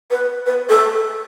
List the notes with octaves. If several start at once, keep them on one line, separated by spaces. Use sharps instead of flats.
B4
B4
A4